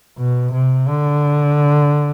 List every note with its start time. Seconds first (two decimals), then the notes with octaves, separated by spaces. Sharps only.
0.18 B2
0.53 C3
0.88 D3